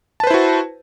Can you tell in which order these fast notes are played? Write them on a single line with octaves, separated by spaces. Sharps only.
A5 B4 C5 E4 F#4